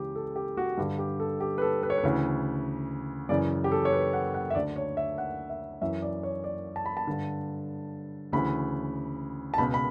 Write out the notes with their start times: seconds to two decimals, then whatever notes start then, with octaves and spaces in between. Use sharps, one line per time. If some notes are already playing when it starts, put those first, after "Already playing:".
Already playing: C#2 C#3 E3 G4
0.16 A4
0.36 G4
0.57 F#4
0.77 G2 D3 G4
0.99 G4
1.20 A4
1.40 G4
1.58 B4
1.62 A4
1.83 B4
1.90 C#5
1.98 B4
2.03 D2 C#3 E3
3.29 F#2 C#3 E3 D5
3.64 G4
3.72 A4
3.85 C#5
3.92 B4
4.13 F#5
4.34 F#5
4.50 E5
4.55 D2 D3 D5
4.76 C#5
4.97 E5
5.18 F#5
5.50 E5
5.81 F#2 E3 E5
6.02 D5
6.23 C#5
6.44 D5
6.76 A5
6.86 B5
6.97 A5
7.07 G2 D3
8.32 D2 C#3 E3 B5
9.54 A5
9.58 C#2 B2 B5
9.74 B5